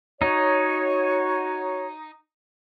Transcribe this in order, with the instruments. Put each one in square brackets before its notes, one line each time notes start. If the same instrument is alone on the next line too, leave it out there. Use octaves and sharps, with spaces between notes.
[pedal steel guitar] D#4 [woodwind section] F#4 C#5